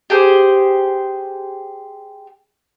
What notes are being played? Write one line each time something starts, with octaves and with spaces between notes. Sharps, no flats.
G4 G#4 C5